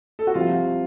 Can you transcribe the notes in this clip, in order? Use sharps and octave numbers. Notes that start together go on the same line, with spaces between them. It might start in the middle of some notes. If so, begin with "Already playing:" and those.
A4
F#4
C2 C3 F3 F4